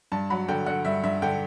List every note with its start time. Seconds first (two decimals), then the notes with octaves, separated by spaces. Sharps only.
0.12 G2 A5
0.30 F#3 B5
0.48 D3 G5
0.66 D3 F#5
0.85 G2 E5
1.04 G2 E5
1.22 D3 G5